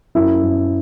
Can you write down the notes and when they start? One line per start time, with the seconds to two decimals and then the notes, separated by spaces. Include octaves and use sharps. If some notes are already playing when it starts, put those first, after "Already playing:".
0.15 F#2 E4
0.42 F#2